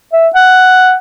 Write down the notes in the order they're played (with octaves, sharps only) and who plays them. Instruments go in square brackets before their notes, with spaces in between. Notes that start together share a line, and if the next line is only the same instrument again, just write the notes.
[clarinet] E5
F#5